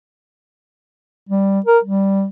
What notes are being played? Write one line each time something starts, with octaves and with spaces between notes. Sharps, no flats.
G3
A#4
G3